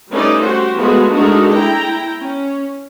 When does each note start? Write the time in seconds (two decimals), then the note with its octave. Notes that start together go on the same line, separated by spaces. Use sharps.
0.12 G3 A3 C#4 D#4 B4 D5
0.42 F#4 G4 C5
0.78 F3 G#3 A3 B3 F#4 B4
1.13 G#3 A3 D4 D#4 F#4 A#4
1.53 E4 G5 A#5
2.22 C#4